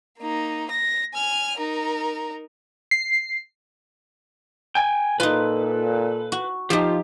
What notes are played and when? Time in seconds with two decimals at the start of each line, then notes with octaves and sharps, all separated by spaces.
0.18 A#3 D#4
0.71 A#6
1.14 G#5 F6
1.58 D#4 A#4
2.91 C7
4.75 G5 G#5
5.20 A#2 D#4 F4 A4 B4
6.32 F#4
6.70 F3 D#4 F4 G4